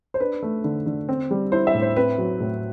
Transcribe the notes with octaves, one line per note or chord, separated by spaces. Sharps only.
C5
D4 B4
A3
D3
D3
C4
G3
E4 C5
E5
A2
C5
C4 B4
F#3
A2